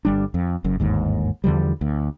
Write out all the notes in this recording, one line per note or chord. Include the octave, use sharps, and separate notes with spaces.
G1 G3 D4
F2
F#1 F#2
G1 D#2 G#2
E2 D3 F3 G3
D2